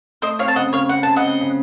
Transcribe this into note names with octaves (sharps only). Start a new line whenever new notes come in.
A3 C5 D#5
C4 C#5 F5
A5
C#3 D#5 F#5
C#3 C#5 F5
C4 F#5
C#3 A5
D#5 F#5
C4
C#3